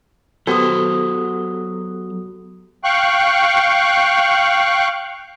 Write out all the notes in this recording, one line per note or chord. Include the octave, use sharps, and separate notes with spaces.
F#3 B3 F#4 G4 A4 C5 D#6
F5 G5 C#6 F#6